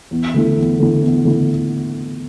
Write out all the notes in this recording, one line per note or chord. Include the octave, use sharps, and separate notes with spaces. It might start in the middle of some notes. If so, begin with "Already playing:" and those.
E2
D3 A3 E4
E2
D3 A3 E4
E2
D3 A3 E4